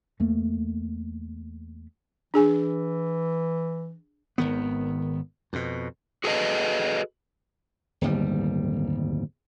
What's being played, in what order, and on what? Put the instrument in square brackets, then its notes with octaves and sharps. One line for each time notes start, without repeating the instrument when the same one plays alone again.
[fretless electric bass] E2 A3 A#3
[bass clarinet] E3 [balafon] D4 G#4 G#5
[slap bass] G#1 D#3 B3
F2 B2
[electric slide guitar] F#4 G#4 A4 B4 D#5
[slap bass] D1 G1 D#2 G3